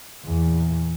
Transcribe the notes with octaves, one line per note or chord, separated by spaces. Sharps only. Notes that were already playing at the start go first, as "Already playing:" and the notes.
E2 A#2